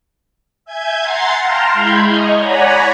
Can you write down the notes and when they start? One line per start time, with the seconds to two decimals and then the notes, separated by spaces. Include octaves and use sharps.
0.65 E5 G#5 G6 G#6
0.99 F#5 A#5 C6 A6 C7
1.39 F5 G5 A5 A#5 C6 F6
1.72 G#3 E4 B5 C6 G6 G#6
2.05 D#5 G#5 A#5 C#6
2.37 C#5 D5 F#5 G#5 A#5 B5